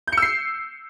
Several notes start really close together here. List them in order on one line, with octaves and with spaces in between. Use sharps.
G6 C#7 E6 C7